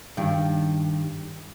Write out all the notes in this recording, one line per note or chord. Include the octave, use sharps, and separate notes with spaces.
G2 D#3